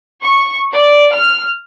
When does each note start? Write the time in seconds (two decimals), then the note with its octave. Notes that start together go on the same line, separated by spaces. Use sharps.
0.24 C#6
0.72 D5
1.12 F6